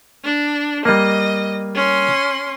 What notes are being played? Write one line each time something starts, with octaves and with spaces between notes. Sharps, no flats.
D4
G3 A#3 D#5
C#4 C6